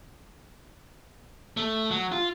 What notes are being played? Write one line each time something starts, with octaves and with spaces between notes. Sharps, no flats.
A3
F#3
F4